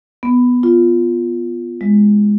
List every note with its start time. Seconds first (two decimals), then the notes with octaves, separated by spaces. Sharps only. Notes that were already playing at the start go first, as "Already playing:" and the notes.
0.23 B3
0.63 F4
1.81 G#3